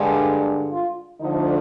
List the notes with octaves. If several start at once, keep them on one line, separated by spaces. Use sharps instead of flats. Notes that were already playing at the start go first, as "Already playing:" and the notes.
Already playing: G2 D3 G#3
F4
D2 D3 F3 D#4